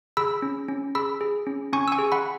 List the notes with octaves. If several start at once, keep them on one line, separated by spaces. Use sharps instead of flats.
G#4 B5 E6
C#4
C#4
G#4 B5 E6
G#4
C#4
C#4 G#5 C#6
E6
G#5 C#6
G#4
F#5 B5